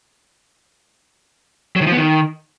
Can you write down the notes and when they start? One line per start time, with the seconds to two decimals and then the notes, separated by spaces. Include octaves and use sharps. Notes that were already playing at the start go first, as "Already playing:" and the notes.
1.76 F#3
1.81 D#3
1.87 F3
1.92 B3
1.97 D#3